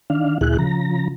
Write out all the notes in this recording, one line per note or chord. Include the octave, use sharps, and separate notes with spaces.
D#3 D4 F5
D2 A#2 E4 G#4 F#6
C#3 F3 A#5